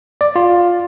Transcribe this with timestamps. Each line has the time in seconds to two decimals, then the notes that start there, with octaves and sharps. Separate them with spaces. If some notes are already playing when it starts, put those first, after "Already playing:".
0.21 D5
0.36 F4